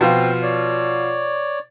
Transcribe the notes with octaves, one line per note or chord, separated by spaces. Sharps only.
B2 F3 C4 F4 G5 C6
C#5 D5